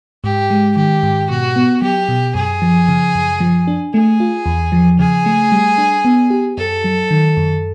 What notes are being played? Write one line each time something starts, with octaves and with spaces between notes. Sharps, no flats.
G#2 G4
G#3
D#3 G4
G#2
B2 F#4
B3
F#3 G4
B2
F#2 G#4
F3
C#3
F#2
F3
D4
A3 G#4
F4
E2
F3
C#3 G#4
A3
G3
D4
B3
G4
F#2 A4
F#3
D#3
F#2